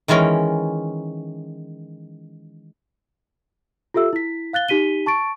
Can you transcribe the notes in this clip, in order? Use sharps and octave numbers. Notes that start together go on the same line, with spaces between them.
D#3 E3 G#3 C#4 A#4
F4 G4 A4 E5 E6
E4 B6
F5 F#6 A6 G7
D#4 G4 B6 D#7 G7
A5 C#6 A6 D7